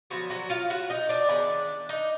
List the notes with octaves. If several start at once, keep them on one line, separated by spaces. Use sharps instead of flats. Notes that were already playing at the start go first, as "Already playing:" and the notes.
D3 F3 F#3 B3 F#4
F#3 F#4
F4 F5
F#4 F#5
D#4 D#5
D4 D5
D#3 G#3 B3
D#4 D#5